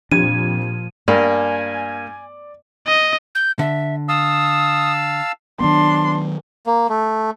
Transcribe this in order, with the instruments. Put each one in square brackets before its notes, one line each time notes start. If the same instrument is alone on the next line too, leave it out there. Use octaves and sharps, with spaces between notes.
[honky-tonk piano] F2 G4 G#6 [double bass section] A#2 F3 [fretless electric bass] D4 [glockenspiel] D#7
[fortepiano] G2 [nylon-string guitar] A#3 [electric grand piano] D5 [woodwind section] G#5
[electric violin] D#5
[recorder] G6
[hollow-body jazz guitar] D3 [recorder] E5
[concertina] F5 A5 E6 [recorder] D#6
[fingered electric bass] D#3 F#3 B3 [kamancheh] D4 C6
[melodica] A#3
A3